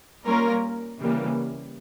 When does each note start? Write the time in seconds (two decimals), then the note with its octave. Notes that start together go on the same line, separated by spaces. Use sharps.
0.25 G3 A#3 C#4 F4 A#4
0.99 C#3 E3 G3 A#3